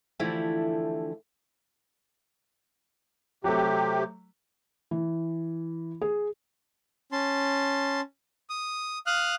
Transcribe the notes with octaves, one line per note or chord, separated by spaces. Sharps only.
D3 E3 F3 A3 E4 G4
C3 F#3 A3 G4
E3
G#4
C#4 A5 C6
D#6
F5 D#6 F6 F#6